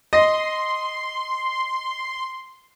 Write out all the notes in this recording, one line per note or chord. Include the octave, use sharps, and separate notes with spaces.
D#5 C6